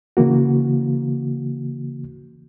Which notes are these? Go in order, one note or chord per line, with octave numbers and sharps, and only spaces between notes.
C#3 E3 A#3 F#4